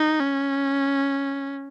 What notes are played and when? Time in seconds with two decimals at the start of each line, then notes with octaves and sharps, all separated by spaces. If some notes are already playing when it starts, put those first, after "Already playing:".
Already playing: D#4
0.20 C#4